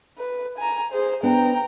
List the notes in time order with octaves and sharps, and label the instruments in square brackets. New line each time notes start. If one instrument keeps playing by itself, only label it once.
[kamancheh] B4
G#5 A#5
G#4 C5
[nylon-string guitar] B3 D4 [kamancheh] G5 A#5